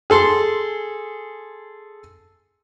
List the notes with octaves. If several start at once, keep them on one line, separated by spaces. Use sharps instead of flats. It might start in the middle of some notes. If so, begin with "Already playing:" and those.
G#4 A4 C6